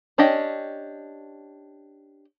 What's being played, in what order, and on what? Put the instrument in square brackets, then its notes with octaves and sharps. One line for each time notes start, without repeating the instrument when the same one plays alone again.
[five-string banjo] C#4 D4 G4 D#5 G5